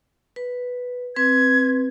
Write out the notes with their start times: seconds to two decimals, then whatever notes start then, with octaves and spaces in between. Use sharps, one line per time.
0.36 B4
1.16 C4 B4 G#6